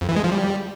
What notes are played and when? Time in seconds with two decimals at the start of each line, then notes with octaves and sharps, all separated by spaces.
0.01 F2
0.09 E3
0.16 G#3
0.24 F3
0.32 G3